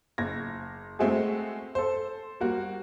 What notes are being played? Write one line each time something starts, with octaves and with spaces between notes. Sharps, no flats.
F#1 G#6 A#6
G#3 A3 C4 E4 F#4 G#4
A4 C5
G3 A#3 F#4